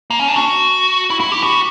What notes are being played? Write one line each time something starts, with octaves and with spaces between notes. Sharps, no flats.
A#3
C#4
D4
F#4
E4
E4
G4
F#4